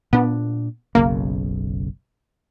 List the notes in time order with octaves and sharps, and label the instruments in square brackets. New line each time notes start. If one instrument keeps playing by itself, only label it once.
[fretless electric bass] A#2 D4 [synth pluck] B3
[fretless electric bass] F#1 B1 C#3 [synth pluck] A#3